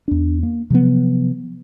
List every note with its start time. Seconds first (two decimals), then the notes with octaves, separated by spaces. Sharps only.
0.08 E2 D4
0.43 A#3
0.70 C3 F3 F#3 B3